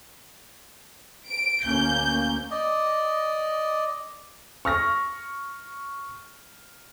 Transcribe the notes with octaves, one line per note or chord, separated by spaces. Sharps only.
D7
D2 A#3 C#4 G6
D5 D#5
C#6 F6 A#6